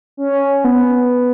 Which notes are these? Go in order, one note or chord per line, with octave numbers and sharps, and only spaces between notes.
C#4
B3